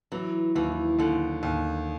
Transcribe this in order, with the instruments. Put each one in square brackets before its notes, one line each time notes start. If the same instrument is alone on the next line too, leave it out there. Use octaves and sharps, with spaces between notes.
[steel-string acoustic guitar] E3 [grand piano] F#3
[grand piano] D#2 [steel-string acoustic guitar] E3
[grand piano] D#2 [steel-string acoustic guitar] D3
[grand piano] D#2